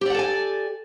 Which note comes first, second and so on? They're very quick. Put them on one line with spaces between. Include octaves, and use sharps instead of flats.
G4 D5 F#5 A4 G#5